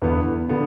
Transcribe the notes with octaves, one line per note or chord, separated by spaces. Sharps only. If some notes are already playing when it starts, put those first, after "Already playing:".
E2 D3 B3
D3 B3